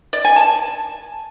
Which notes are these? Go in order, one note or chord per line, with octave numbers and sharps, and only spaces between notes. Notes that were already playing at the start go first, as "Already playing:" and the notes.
D5
G#5
A5